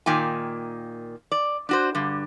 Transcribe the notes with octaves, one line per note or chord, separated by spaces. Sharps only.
A#2 D#3 A#3 G5 G#5
D5
D4 F#4 C5
G2 D3